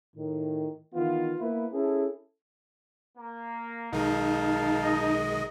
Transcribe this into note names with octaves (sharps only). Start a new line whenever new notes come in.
A2 D#3
D#3 E3 B3 F4
A#3 B3 E4 B4
C#4 E4 G#4 A4
A#3
B1 D#3 G#3 D#4 A#4 F5 A5
D#5